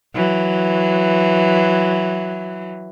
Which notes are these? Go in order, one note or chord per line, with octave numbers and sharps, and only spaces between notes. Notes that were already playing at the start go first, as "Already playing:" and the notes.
E3 F#3